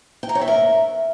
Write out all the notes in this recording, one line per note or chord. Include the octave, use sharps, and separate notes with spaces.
G5
A#5
C#5
E5
A#4